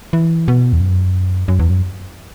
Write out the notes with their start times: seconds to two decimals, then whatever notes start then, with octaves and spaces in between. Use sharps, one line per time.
0.13 E3
0.48 B2
0.73 E2
0.80 F#2
1.48 F#2
1.59 E2
1.70 F#2